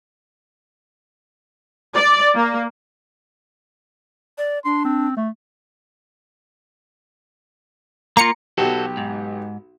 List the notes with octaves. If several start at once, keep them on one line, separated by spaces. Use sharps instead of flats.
D5
A#3
D5
D4 C6
C4
A3
A#3 F4 A#5 C#7
B1 F#3 F#4 G4 A4
G#2